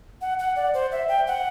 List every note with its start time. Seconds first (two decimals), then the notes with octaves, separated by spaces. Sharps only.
0.21 F#5
0.39 F#5
0.56 D5
0.74 C5
0.92 E5
1.08 G5
1.27 F#5